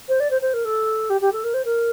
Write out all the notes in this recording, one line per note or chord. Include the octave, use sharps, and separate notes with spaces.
C5
D5
C5
C5
A#4
A4
G4
G4
A4
A#4
C5
A#4